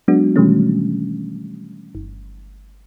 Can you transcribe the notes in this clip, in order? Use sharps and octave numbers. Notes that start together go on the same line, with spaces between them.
F#3 G#3 B3 D4 F#4
B2 D#3 E3 G3 A3 C#4
G1